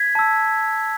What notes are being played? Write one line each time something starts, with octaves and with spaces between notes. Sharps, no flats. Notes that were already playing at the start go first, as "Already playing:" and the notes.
Already playing: G#6 B6
A5 E6